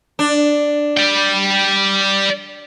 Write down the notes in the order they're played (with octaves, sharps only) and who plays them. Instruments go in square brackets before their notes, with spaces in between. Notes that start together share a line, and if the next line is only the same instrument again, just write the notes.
[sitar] D4
[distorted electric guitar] D5 G5